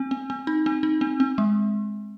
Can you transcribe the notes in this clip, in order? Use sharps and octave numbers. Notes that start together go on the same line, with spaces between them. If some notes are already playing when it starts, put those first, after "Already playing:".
Already playing: C4
C4
C4
D#4
C4
D#4
C4
C4
G#3